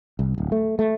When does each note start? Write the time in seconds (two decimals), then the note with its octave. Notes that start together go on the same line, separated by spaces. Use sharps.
0.19 C2
0.38 D1
0.52 A3
0.79 A3